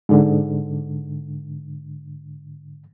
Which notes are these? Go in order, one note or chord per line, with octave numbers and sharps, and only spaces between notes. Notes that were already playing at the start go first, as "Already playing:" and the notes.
G#2 D3